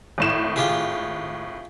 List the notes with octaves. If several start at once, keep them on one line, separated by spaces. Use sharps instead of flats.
G#1 A2 E7
F4 G4 G#4